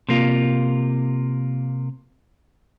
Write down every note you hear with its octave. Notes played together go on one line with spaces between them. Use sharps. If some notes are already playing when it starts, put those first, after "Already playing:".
C3 A#3 F4